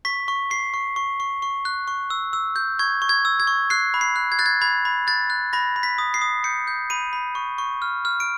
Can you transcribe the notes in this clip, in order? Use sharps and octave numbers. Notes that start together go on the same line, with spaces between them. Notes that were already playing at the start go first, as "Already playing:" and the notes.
C#6 B6
C#6
C#6 C7
C#6
C#6
C#6
C#6
F#6
C#6
E6
E6
G6
C#6 G#6
C#6
G#6
E6
G#6
C#6
F#6 C7
B5
C7
F#6
G#6
F#6 A6
G#6
B5 G#6
B5
F#6 A6
F#6
B5 A#6
B5
B6
D#6
C7
D#6
G6 C#7
G6
B5 D#7
B5
C#6
C#6
F6
F6
D7